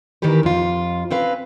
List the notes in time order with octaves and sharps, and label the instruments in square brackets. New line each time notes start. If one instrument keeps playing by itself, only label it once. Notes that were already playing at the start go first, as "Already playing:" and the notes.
[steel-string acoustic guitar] D#3 E3 A#3 G4 B4
F2 F4
C4 C#4 B4 F5